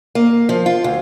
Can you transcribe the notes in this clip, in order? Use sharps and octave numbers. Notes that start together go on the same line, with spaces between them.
A#3
F3
F4
D2